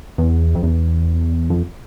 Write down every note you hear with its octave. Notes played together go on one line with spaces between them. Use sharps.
E2
F2
E2
F2